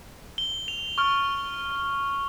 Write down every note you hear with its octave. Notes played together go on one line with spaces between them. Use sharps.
G7
F7
C#6 F6